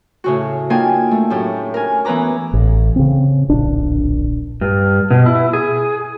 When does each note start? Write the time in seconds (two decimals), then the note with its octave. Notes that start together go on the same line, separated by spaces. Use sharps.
0.24 A2 C#3 F#4
0.70 A#3 D4 D#4 F4 G5 G#5
1.11 A3
1.30 F#2 A2 G4
1.74 A#4 G#5
2.05 E3 B3 C#4 B4 A#5 D6
2.53 A1
2.96 C#3 C4
3.49 D1 A#1 D4
4.61 G2
5.11 B2
5.26 E4
5.53 G#4